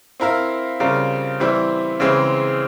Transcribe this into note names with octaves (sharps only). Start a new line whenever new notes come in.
C4 E4 A#4 F5
C#3 G3 C4 F4 A#4
E3 G3 C4 E4
C#3 E3 G#3 C4